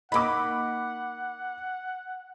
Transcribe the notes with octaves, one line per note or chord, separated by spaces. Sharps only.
A#3 D#4 F#5 B5 D6